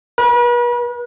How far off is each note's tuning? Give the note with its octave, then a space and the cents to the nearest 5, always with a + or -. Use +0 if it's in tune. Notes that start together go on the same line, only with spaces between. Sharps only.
B4 -40